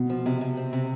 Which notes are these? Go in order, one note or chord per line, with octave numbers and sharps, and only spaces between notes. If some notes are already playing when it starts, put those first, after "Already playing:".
Already playing: B2
F3
C3
C3
C4
C3